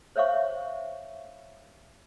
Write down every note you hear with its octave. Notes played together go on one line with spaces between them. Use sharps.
C5 C#5 E5 F5 C#6